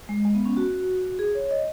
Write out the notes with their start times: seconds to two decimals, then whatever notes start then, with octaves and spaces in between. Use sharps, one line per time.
0.09 G#3
0.25 G#3
0.35 B3
0.46 C#4
0.57 F#4
1.19 G#4
1.35 C#5
1.51 D#5